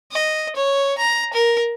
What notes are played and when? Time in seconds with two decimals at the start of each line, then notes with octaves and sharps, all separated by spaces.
0.12 D#5
0.56 C#5
0.98 A#5
1.33 A#4